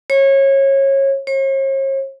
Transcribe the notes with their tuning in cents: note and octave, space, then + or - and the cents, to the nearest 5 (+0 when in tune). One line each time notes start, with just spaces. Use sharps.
C#5 -25
C#5 -45